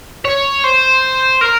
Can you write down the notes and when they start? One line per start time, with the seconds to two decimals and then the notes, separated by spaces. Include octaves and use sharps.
0.25 C#5
0.64 C5
1.41 A#4